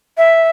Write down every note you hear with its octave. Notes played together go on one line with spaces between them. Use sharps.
E5